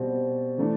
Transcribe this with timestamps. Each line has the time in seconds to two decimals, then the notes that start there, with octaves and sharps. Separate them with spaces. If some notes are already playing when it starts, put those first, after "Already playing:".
Already playing: B2 G3 C4
0.58 E3 A3 D4